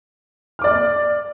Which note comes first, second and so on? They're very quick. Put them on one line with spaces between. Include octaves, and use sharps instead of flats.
F6 D6 D5